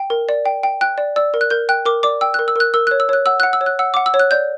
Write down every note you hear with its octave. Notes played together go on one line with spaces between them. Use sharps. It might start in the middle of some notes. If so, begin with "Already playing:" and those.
Already playing: G5
A#4
D5
G5
G5
G5 F#6
D5
D5 E6
A#4
F#6
A#4 G6
G5 F#6
A#4 D6
D5 D6
G5 E6
A#4 F#6
E6
A#4 F#6
A#4 E6
C#5 F#6
E6
C#5 F#6
F#5 E6
F#5 F#6
E6
C#5
F#6
F#5 E6
F#5 D6
E6
C#5
F#6
D5 G6